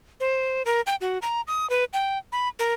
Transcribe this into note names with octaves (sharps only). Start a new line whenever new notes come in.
C5
A#4
G5
F#4
A#5
D#6
B4
G5
B5
A#4